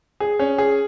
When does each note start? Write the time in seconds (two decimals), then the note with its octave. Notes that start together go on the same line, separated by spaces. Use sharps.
0.20 G#4
0.39 C#4
0.58 G#4